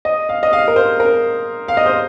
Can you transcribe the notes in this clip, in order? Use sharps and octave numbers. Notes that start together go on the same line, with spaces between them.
D#5
F5
D#5
F5
A#4
C5
A#4
F5
D#5
C5